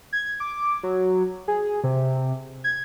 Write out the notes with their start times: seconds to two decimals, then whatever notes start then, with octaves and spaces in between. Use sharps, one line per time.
0.13 G#6
0.40 D6
0.83 F#3
1.48 G#4
1.84 C3
2.64 G#6